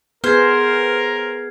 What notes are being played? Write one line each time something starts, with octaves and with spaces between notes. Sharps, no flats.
B3 G#4 A#4 C5 F6 G#6 C7